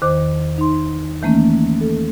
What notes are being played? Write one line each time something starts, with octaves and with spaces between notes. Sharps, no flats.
E2 D#3 C5 D6
D#4 C6
D#3 E3 A3 A#3 C#4
A4